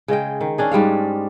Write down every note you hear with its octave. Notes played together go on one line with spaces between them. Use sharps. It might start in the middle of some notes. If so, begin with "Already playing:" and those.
C#3 G#3 D#5 G5
D#3
C#4 D4 G#4
G#2 G3 G#3 F5